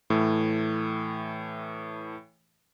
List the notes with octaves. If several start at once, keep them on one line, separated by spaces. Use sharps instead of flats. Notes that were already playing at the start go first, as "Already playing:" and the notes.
A2 E3 A3